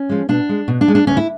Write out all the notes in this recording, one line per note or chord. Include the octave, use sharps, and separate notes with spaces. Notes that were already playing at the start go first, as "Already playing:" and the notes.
Already playing: C#4
F3 G#3
B2 D4
G#3
B2
D4
G#3
D4
D2 C#4
E4